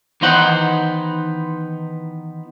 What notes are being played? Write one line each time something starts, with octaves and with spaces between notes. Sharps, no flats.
D#3 E3 B3 D#4 C5 F#5